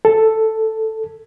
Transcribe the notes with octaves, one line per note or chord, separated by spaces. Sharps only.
A4